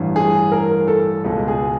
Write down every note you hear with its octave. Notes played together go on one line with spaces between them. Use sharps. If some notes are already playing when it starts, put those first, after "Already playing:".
Already playing: A1 G2 E3
G#4
A#4
A4
C#2 B2 G#3
G#4